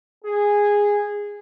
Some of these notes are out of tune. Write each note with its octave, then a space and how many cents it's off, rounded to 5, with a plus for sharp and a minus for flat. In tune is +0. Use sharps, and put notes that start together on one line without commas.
G#4 -10